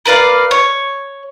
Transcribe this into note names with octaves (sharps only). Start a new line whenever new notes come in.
A#4 B4 D5 F5
C#5